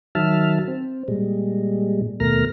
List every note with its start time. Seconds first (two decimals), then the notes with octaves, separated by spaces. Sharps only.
0.15 D#3 F#3 E5 A5 F6
0.68 C4
1.08 A#2 G3 G#3
2.20 D#2 B2 A3 A#4 F6 A#6